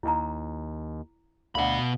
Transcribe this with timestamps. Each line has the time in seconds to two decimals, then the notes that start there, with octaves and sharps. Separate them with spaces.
0.03 D#2 E4 A#5
1.55 D2 B2 F5 F#5 B5